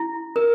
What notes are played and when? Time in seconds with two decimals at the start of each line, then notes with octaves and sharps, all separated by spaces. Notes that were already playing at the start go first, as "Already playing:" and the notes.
Already playing: E4
0.36 A#4